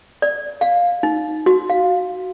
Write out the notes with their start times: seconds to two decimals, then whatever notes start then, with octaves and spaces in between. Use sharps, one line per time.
0.22 D5
0.61 F5
1.03 D#4
1.46 F#4
1.70 F5